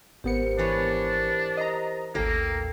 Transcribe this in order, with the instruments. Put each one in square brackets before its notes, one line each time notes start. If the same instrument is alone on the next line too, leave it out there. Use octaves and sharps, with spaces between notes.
[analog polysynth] G#1 B3 C#7 [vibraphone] G4 A#4 C5
[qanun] E3 B4 C#5 [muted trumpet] D4
[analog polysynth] D#5 A#5
[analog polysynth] A1 D#2 [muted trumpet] A#3 [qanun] A4 A#4 G5